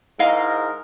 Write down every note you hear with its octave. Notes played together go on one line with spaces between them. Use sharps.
G#2 E4 G#4 A#4 D#5 F5